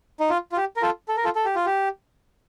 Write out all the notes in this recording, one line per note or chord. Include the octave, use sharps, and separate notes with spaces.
D#4
F4
F4
G4
A#4
F4 A4
A4
A#4
F4 A4
A4
G4
F4
G4